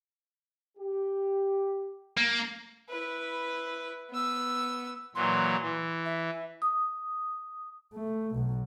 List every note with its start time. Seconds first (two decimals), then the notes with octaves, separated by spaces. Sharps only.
0.77 G4
2.17 A#3
2.90 E4 B4
4.10 B3 E6
5.15 A#2 E3 F#3 C6
5.61 E3
6.05 E5
6.62 D#6
7.94 A3
8.34 B1 B2